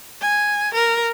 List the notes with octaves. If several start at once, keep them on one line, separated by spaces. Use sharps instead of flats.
G#5
A#4